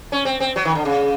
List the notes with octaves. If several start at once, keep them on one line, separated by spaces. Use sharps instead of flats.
C#4
C4
C4
F#3
D#3
D3
C#3